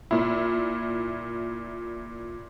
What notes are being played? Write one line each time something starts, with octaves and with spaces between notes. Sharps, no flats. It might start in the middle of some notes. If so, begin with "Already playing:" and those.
A#2 E4